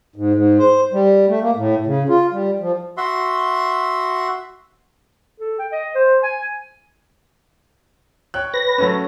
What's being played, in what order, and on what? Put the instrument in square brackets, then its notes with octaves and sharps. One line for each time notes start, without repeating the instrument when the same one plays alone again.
[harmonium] G#2
G#2
C5
G3
A3
A#3
A2
C#3
F4
G3
F3
[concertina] F#4 E5 C6
[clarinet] A4
G5
D#5
C5
G#5
[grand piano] C#5 G5 F#6
[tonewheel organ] B4 A#6
[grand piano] F#3 A3 C#4